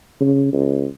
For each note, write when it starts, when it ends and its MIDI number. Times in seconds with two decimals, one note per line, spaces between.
0.21 0.49 49
0.52 0.87 37